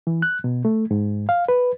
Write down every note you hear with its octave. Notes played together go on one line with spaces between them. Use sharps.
E3
F#6
B2
A3
G#2
F5
B4